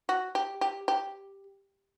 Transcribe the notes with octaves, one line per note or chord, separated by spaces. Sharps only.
F#4
G4
G4
G4